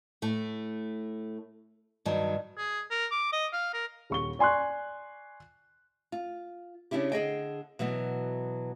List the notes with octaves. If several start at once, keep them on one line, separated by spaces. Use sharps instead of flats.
A2 A3
G2 D#3 F#3 A5
G#4
A#4
D6
D#5
F5
A#4
D#1 C#6 G7
D5 G#5 C6 C#6 F#6
F4
C#3 C#4 D4 E4 G4
D3 G#4 D#5 G5
B2 E3 F#3 B3